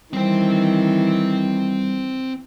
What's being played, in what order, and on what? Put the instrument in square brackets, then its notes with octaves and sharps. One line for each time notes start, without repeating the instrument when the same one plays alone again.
[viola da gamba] D#3 E3 [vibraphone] G3 [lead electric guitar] C4 C5